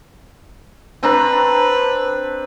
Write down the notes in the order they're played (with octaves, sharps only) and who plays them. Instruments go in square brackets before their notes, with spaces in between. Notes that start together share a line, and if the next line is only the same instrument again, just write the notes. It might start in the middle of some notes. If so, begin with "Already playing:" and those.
[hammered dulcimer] C4 D4 A#5 [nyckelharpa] B4